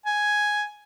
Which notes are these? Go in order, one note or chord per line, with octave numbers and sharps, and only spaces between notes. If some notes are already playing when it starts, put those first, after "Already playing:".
G#5